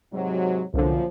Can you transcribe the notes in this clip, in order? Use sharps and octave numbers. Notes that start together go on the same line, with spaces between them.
G#2 C3 F#3
C2 F#2 A#2 D3 F3